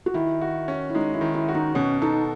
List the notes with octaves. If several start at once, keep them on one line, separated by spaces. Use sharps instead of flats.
F#4
D#3 E4
F#4
C#4
E4
G#3 D#4
E4
D#3
E4
F#4
D#4
B2 C#4
D#4 A4